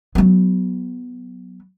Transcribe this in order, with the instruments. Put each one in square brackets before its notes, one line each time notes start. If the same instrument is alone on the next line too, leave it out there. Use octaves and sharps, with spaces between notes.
[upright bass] F#3 B3